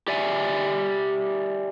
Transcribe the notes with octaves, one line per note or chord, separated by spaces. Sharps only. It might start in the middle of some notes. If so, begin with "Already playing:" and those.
G4 D5 E5 G#5